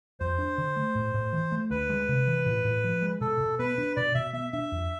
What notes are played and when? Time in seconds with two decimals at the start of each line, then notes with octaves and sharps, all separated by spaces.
0.20 F2 C5
0.38 D4
0.58 D3
0.76 A3
0.95 A2
1.14 A2
1.33 E3
1.52 A3
1.70 D2 B4
1.89 G#3
2.09 C3
2.27 E3
2.46 A2
2.65 A2
2.84 F3
3.02 G#3
3.21 B2 A4
3.40 B2
3.59 B3 B4
3.78 D4
3.96 B2 D5
4.15 B2 E5
4.33 B3 E5
4.53 D4 E5
4.72 F2